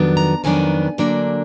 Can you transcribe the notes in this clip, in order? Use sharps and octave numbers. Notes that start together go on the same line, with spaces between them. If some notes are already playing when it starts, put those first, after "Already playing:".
Already playing: F2 D#3 F#3 B3 D4
A#5
F2 D#3 F#3 B3 D4 G#5
D3 F#3 A#3 D4